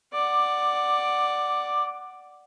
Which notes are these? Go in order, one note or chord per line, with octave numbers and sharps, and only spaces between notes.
D5 F#5 D6